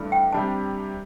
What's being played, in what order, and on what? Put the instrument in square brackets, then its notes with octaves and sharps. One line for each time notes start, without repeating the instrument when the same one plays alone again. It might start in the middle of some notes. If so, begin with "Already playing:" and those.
Already playing: [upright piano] G2 E3 A3 D4
[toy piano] G5
[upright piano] C3 G3 D4 [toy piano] A5